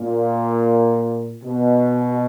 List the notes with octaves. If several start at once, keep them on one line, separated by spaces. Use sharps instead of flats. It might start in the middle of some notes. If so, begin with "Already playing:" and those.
Already playing: A#2
B2